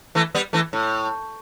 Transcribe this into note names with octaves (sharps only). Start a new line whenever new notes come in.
E3 A3
G3 B3
E3 A3
A2